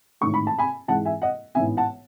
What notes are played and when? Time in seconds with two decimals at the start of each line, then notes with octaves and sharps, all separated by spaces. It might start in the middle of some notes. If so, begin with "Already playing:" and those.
0.21 A1 G#2 D#3 A3 C#6
0.34 B5
0.47 A5
0.59 G#5 B5
0.88 G#2 E3 G#3 F#5 A5
1.05 E5 G#5
1.22 D#5 F#5
1.55 A1 G#2 E3 B3 E5 G#5
1.77 F#5 A5